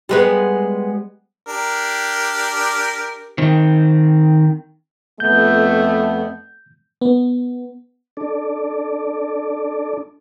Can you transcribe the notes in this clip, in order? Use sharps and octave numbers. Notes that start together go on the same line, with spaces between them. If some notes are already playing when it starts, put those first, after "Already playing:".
G3 G#3 B3
D4 G4 A#4
D#3 C4
F2 A3 B3 G6
B3
D4 A4 D5